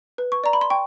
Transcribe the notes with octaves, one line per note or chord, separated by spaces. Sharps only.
B4
C#6
D5 A#5
B5
C6
G5 C#6